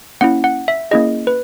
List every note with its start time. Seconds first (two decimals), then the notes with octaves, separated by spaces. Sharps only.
0.21 A#3 C#4 E4 F#5
0.44 F#5
0.68 E5
0.91 A#3 C#4 E4 G#4 D#5
1.27 B4